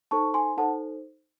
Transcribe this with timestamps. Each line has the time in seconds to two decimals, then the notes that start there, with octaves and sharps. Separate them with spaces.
0.11 D#4 A4 C5 A5 C#6
0.34 G#5 C6
0.57 D#4 A4 C5 F#5 A5